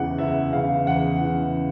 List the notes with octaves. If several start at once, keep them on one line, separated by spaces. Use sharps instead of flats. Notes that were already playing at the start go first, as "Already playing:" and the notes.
Already playing: E2 C#3 E3 F#5
E2 E5
C#3 E3 F5
E2 F#5
C#3 E3